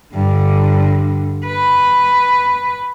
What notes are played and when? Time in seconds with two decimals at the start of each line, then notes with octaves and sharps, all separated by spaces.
0.15 G2 D3
1.46 B4